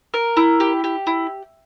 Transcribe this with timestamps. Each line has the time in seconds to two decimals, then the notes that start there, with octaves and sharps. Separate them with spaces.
0.14 A#4
0.37 E4
0.60 G4
0.84 G4
1.07 E4